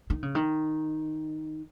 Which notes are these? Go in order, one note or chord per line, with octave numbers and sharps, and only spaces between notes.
D#3
C#3
D#3